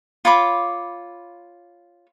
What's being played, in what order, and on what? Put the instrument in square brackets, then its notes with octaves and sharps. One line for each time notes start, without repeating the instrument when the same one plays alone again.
[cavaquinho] F4 C#5 B5 D6